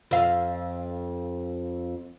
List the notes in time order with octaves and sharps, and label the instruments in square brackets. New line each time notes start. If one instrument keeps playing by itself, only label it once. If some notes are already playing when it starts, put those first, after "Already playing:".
[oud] F2 F5